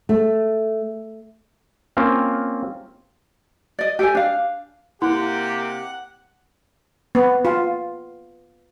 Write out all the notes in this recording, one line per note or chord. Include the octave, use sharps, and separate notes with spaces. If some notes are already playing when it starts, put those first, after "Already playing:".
A3
A#3 C4 C#4 F4
D5 D#5
G4 A4 C5 G#5
D4 F5
C3 A#3 E4 G4 F#5
B3
F4